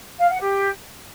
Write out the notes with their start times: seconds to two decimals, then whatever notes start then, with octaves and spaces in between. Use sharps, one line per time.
0.19 F5
0.29 F#5
0.39 G4